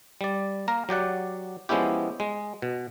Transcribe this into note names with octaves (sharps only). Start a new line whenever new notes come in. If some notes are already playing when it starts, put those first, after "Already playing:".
G3 D5
A#3 A#4 A#5
F#3 G4 D5 F#5
F3 G#3 B3 C#4 E4 G4
G#3
B2